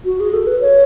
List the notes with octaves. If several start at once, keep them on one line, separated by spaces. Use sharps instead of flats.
F#4
G#4
A4
B4
C#5